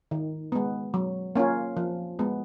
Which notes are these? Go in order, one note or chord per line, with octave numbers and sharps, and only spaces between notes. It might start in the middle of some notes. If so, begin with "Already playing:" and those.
D#3
G#3 B3
F#3
A#3 C#4 F4
F3
G#3 B3